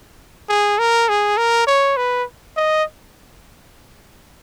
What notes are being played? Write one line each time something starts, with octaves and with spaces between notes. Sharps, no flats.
G#4
A#4
G#4
A#4
C#5
B4
D#5